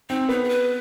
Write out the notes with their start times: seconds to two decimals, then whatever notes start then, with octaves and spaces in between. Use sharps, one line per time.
0.09 C4 D#4
0.29 B3 D#4
0.44 G#4
0.49 B4